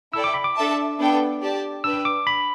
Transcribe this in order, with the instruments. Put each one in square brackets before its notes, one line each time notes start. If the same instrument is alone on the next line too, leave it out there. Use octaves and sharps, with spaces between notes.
[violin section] E4 A4 D5 G5 [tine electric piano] E6
[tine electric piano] D6
B5
D6
[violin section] D4 A4 E5 A5
B3 D4 A4 G5
G4 D5 A5
[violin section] D4 B4 G5 [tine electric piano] E6
[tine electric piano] D6
B5